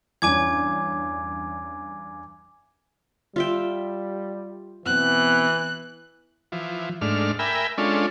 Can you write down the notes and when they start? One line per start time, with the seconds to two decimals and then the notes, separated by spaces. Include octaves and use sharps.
0.22 E2 G2 C#4 G#5 D6 G#6
3.36 G3 F4 E5 G5
4.86 B2 E3 C4 F#6
6.52 E3 F3
7.01 G#2 A3 D4 F6
7.39 A#4 E5 G5 G#5 B5
7.78 G#3 C#4 D4 F4 A4